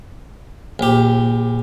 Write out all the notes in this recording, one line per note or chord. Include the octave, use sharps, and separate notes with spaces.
A#1 G4